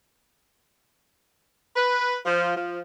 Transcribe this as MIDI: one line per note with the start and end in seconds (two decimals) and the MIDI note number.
1.75 2.18 71
2.24 2.52 53
2.54 2.80 53